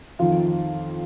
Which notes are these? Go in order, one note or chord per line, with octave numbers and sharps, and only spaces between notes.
F2 D#3 F4